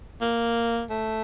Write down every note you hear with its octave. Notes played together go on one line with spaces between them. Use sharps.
A#3
A3